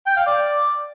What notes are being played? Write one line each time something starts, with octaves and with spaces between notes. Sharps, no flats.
G5
F5
D5